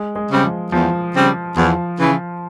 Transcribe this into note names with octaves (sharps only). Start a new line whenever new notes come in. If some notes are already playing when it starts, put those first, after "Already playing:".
Already playing: G#3
G#3
C#3 G3 C4
F3
E2 F3
C#3 G3 C4
E2 F3
C#3 E3